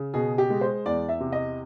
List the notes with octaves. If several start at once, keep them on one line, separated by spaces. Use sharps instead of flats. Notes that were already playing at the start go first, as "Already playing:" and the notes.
Already playing: C#3
B2 G#4
G4
G#3
C5
E2 D5
E5
C3
D#5